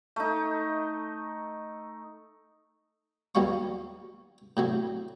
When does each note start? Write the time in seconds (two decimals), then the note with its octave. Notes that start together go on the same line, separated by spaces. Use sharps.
0.16 A3 D#4
3.35 D#2 F#3 G3 C#4 F5 C#6
4.57 A2 C3 F#3